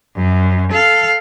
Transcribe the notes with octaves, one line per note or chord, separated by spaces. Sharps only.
F#2
A4 F5